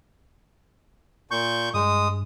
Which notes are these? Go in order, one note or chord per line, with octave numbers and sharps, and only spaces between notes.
A#2 C#6 G6
G2 G#3 D#6